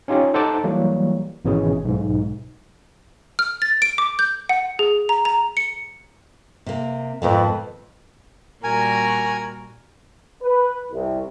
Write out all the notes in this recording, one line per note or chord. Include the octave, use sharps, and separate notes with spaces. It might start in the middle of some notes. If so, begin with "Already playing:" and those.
C#4 D#4 F4 G4 C#5
D#4 A4 C5 F#5 A5 D6
E3 F#3 G3 A#3
G#1 B2 E3 C#4 G#4
B1 G#2
F6
A6
D7
D6
G6
F#5
G#4
A#5
A#5
C#7
C3 A#3
F2 G#2 B2 D#3
A#2 G3 F#4 A#4 G#5
B4
C2